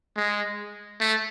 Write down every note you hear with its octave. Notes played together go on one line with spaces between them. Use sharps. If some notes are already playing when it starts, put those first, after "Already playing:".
G#3
A3